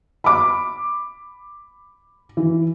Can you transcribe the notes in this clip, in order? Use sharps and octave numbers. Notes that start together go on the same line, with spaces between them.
B5 D6
E3